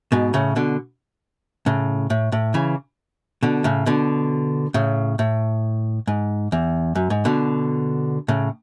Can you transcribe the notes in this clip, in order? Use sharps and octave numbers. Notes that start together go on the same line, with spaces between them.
G#2 B2
A2 C#3
B2 D3
A2 C#3
A2
A2
C#3 E3
B2 D3
A2 C#3
B2 D3
A2 C#3
A2
G#2
E2
F#2
G#2
B2 D3
A2 C#3